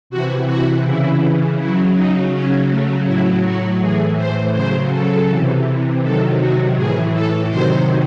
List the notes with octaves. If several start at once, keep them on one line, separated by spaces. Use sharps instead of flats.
C3 E3 F#4
F#4
C#3 E3 E4
C#3 F#3 E4
D#4
C#3 F#3 C#4
A3
A2 F#3 E4
F#4
A2 E3 G#4
C5
C#3 F#3 C5
A4
C3 E3
C3 D#3 F#3 A4
F#4
A2 E3 G#4
A4
C3 D#3 F#3 C5